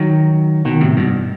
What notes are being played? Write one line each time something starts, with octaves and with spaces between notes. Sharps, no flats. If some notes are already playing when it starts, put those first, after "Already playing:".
Already playing: D#3 F#3
B2 D#3
A2 C3
G2 B2
G2